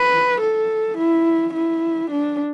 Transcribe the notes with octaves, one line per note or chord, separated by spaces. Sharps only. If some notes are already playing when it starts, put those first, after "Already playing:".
Already playing: B4
A4
E4
E4
D4